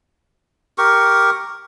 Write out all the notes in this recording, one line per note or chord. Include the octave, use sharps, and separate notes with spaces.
G4 A#4 C#6